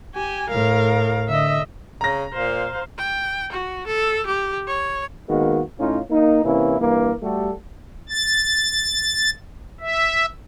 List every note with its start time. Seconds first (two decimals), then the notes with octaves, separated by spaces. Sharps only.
0.15 G4 G#5
0.51 A2 A#4 F5
1.29 D3 D#5 E5
2.01 C#3 A#5 A#6
2.33 A#2 C5 F5
2.98 G5
3.52 F#4
3.87 A4
4.26 G4
4.67 C#5
5.29 D#3 G#3 A#3 B3 F#4
5.79 A2 C#4 D#4 F4
6.10 A#3 D#4
6.45 C3 E3 A#3 C#4 E4
6.80 G2 E3 A#3
7.23 G3 A3 F#4 G4 A4
8.09 A6
9.81 E5